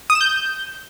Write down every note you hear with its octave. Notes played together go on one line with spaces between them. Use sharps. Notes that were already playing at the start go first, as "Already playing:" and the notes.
D#6
E7
G6